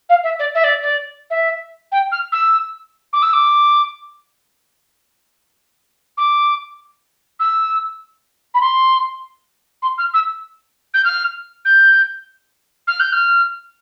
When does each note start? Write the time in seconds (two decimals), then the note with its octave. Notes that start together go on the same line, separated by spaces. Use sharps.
0.09 F5
0.23 E5
0.39 D5
0.54 E5
0.63 D5
0.82 D5
1.30 E5
1.91 G5
2.11 F6
2.32 E6
3.13 D6
3.22 E6
3.33 D6
6.17 D6
7.39 E6
8.54 B5
8.61 C6
9.82 C6
9.97 F6
10.13 E6
10.93 G6
11.04 F6
11.65 G6
12.87 F6
12.99 G6
13.12 F6